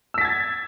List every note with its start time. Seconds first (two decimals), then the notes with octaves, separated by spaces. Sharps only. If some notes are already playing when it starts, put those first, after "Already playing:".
0.14 E6
0.18 B6
0.21 A6
0.25 G#6